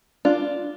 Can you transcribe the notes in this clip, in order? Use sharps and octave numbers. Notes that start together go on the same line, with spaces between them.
D4 F4